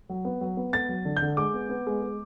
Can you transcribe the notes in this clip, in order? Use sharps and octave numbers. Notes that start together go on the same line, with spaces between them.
F#3
B3
F#3
B3
B3 A6
F#3
D3
G6
D3
G#3 D6
B3
B3
G#3
G#3